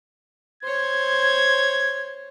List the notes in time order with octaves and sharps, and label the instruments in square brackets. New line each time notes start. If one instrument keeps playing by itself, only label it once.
[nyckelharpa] C5 C#5 [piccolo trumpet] G#6